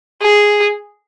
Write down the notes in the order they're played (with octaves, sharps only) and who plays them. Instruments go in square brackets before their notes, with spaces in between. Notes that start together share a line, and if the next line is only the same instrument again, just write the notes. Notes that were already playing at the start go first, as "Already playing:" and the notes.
[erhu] G#4